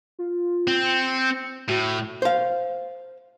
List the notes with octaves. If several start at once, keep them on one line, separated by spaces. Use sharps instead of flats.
F4
C4
C#7
A2 F#4
C5 F5